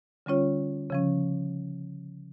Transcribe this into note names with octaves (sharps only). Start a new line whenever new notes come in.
D3 G3 C#4 F4 C#5
C#3 F3 C#4